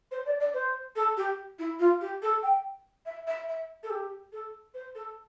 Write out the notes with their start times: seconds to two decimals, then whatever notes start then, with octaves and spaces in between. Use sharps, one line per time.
0.11 C5
0.26 D5
0.40 D5
0.53 C5
0.95 A4
1.17 G4
1.58 E4
1.79 F4
2.01 G4
2.22 A4
2.42 G5
3.05 E5
3.27 E5
3.48 E5
3.83 A4
3.90 G4
4.32 A4
4.74 C5
4.95 A4